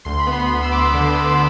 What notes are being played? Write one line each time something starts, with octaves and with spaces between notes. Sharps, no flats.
D2 C6
B5
B3
C6
D2
E6
D2 D6
D3
D3